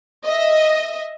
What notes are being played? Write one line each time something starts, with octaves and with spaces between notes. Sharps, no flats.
D#5 E5